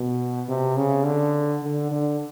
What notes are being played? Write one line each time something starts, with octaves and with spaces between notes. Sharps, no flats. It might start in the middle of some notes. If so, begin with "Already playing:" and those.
Already playing: B2
C3
C#3
D3
D3
D3